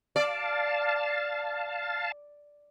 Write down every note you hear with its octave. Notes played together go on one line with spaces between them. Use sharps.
D5 F5 A5